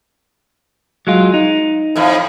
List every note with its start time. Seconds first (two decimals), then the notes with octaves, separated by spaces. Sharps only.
1.07 F#3 G#3 F4
1.34 D#4
1.96 F2 A2 F3